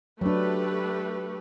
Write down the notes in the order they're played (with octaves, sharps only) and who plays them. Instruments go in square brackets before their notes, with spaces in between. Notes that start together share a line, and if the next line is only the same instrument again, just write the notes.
[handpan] F#3 D4 [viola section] A3 G4 B4